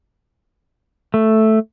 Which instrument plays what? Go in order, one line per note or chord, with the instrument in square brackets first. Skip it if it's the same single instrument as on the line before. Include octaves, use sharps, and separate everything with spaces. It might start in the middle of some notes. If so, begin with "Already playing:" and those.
[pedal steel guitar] A3